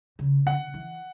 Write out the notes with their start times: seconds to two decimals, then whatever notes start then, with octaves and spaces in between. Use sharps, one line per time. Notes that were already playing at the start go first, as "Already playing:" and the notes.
0.19 C#3
0.46 D3 F#5
0.74 E3